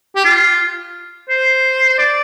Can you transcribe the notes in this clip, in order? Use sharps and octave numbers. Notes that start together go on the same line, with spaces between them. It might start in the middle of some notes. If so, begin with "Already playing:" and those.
G4
F4
C5
D5